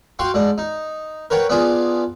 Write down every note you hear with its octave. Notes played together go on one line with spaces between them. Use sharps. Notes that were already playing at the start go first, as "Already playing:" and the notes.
F#4 F5 G5 C6 C#6
G#2 D4
D#4
A#4 B4 C#5 F#5 G5
B3 D4 F4 G#4